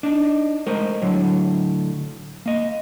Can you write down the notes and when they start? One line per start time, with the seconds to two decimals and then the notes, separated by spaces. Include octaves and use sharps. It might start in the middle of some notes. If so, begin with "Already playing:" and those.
0.03 D4 D#4
0.67 G#3 A3 A#4 C5 D#5
1.02 A2 D3 F#3
2.46 A#3 D#5